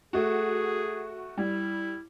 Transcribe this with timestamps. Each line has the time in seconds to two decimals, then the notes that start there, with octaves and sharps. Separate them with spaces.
0.13 A3 F#4 G#4
1.38 G3 E4